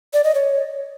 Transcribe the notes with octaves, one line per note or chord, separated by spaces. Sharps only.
D5
D#5
C#5